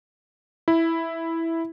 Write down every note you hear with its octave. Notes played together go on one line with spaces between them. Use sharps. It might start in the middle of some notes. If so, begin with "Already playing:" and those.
E4